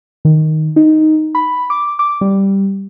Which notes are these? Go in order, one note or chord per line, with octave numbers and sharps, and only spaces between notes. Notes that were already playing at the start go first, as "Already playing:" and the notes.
D#3
D#4
B5
D6
D6
G3